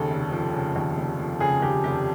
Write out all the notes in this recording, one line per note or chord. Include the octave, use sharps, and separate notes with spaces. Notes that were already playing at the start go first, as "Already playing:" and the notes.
Already playing: D#2 C#3 A4
F1
F3
C#3
D#2
F1
F3
C#3 G#4
D#2 G4
F1 G4